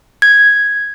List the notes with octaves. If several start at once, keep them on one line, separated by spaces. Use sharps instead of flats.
G#6